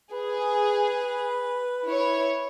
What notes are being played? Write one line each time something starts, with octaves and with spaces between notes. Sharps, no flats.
G#4 B4
E4 C#5